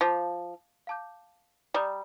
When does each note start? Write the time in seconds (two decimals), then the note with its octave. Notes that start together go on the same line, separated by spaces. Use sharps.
0.01 F3 F5 A5 D6 G6
0.87 F5 A5 D6 G6
1.74 G3 D5 G5 A#5 D#6 G6